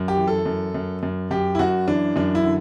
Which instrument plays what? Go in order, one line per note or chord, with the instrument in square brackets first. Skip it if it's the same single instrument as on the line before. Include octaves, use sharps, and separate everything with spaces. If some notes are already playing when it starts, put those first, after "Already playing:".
Already playing: [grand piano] F#2
G4
E3
A4
F#2
F#2
F#2
F#2 G4
E4
F#2 F#4
E3 D4
F#2 D4
E4
D3